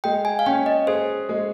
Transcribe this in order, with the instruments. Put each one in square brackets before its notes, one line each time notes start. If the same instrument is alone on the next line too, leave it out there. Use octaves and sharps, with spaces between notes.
[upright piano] G#3 [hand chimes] G5
[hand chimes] G#5
F5
[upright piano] C#4 [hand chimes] G5
[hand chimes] D#5
[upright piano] G#4 [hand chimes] C5
[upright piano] G#3